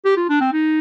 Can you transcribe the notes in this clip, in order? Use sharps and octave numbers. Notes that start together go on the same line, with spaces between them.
G4
F4
D4
C4
D#4